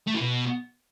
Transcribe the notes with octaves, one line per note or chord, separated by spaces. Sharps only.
A3
E3
B2